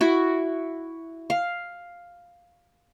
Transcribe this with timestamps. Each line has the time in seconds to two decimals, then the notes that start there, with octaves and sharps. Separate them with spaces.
0.01 E4 F#4
1.30 F5